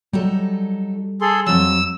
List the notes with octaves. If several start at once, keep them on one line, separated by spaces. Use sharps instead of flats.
F#3 G3 D#4 A4
G#4 A4 C6
F2 F#3 E6